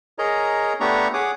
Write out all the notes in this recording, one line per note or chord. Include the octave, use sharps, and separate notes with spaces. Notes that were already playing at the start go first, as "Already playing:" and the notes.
G#4 A#4 C#5 D#5 A#5
A3 B3 D4 G4 A#5 C#6
G#4 C#5 F#5 D6 D#6